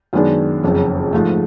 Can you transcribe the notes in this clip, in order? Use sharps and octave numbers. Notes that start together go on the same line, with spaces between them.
F#2 D#3 G#3 B3 D4
F#1 F2 C#3
G#2 F3 A3